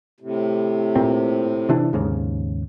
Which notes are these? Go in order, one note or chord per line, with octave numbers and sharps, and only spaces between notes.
A2 C3
A#2 C4
C3 E3 D4
D#2 G#2 C#3